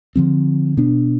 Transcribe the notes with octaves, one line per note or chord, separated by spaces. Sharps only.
D3 F3 C4
B2 B3 D4